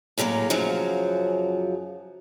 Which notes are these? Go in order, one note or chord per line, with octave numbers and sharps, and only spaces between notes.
A2 C#3 F#3 G3 A#3
F#2 C#3 F3 F#3